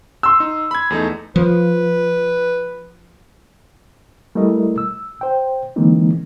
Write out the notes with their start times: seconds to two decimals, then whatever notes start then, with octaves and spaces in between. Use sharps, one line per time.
0.23 C6 E6
0.40 D#4
0.71 B5 G#6
0.90 E2 A3 D#4
1.36 F3 B4
4.35 G3 A3 E4 A#4 D#5
4.78 E6
5.21 C5 G5
5.76 D3 E3 G#3 A#3 C4 D#4